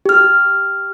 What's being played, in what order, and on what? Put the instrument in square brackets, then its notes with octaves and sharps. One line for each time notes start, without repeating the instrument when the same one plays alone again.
[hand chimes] G4 F6